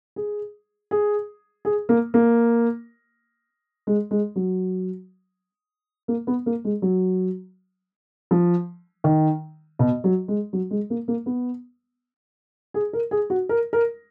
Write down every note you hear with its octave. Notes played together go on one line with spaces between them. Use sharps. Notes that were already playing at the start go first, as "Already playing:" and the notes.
G#4
G#4
G#4
A#3
A#3
G#3
G#3
F#3
A#3
B3
A#3
G#3
F#3
F3
D#3
B2
F#3
G#3
F#3
G#3
A#3
A#3
B3
G#4
A#4
G#4
F#4
A#4
A#4